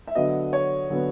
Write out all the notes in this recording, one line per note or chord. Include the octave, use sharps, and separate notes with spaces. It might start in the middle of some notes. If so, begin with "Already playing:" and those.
E5
D3 F#3 B3 D#5
C#5
D3 F#3 B3